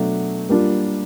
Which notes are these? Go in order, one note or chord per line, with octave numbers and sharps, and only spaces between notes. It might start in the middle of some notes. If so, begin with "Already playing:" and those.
Already playing: B2 F#3 A3 D4
G3 A#3 D4 F4